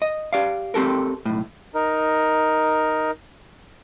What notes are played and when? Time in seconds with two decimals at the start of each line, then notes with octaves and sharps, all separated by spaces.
0.02 D#5
0.33 G4 D5 F5
0.74 C4 G4 A4 A#4
1.25 B1 A2
1.75 D#4 A#4